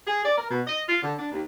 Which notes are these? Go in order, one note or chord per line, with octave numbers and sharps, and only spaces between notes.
G#4
D5
A#4
B2
D#5
F4
D3
D4
D#2